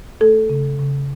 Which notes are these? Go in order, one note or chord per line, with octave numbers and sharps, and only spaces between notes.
A3 A4
C#3
C#3